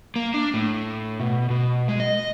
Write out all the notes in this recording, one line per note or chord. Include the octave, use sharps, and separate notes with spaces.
A#3
D4
A2
B2
B2
G#3
D#5